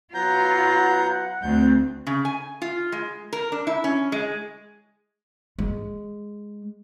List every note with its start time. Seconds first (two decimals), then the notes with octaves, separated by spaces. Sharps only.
0.14 F#3 B3 F4 F#5 A#5 G6
1.43 D2 C4 G6
2.07 C#3
2.25 G#5
2.62 F4
2.92 G#3
3.33 A#4
3.52 D4
3.67 E4
3.84 C#4
4.12 G#3
5.59 G#3